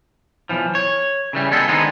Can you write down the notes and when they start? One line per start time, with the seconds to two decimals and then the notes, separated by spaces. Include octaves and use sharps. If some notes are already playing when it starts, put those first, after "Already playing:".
0.49 B1 E3 F3
0.75 C#5
1.33 C#3 E3 G3
1.52 G#3 B3 A4
1.68 D3 D#3 G#3 B3 C4 D#4